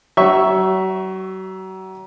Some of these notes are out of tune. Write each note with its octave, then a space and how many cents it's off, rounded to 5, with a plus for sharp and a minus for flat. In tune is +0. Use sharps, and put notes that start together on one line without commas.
F#3 +35 E5 +0 C#6 +0